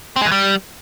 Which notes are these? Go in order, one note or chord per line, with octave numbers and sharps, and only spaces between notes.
C4
G#3
E3
G3